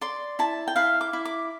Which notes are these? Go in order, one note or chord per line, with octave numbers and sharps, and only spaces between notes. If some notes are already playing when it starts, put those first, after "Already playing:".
D5 C6
E4 A5
G5
E4 F5
D6
E4
D6